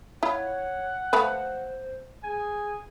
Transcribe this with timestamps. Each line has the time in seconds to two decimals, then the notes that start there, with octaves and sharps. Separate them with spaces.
0.23 E4 F4 C#5 F#5
1.13 F3 A3 B4 C5
2.23 G#4 G#5